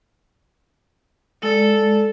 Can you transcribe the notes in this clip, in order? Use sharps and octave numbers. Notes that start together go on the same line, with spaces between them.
G#3 A4 D5